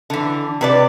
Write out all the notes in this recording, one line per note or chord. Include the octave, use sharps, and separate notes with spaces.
D3 E3
C3 B4 D5